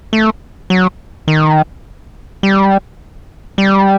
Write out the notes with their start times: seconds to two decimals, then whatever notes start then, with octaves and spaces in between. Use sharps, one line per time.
0.13 A3
0.70 F#3
1.28 D#3
2.43 G3
3.58 G3